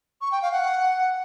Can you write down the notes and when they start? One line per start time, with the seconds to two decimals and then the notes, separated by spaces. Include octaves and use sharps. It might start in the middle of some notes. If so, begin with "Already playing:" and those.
0.21 C#6
0.32 G5
0.42 F5
0.53 F#5